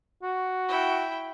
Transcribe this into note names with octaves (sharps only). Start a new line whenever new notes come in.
F#4
E4 G5